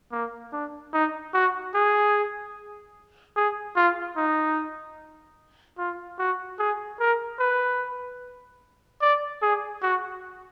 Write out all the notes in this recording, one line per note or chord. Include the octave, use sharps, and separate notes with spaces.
A#3
D4
D#4
F#4
G#4
G#4
F4
D#4
F4
F#4
G#4
A#4
B4
D5
G#4
F#4